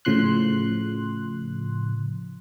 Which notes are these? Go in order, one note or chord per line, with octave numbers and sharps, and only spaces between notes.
A2 C#3 F3 C6 F#6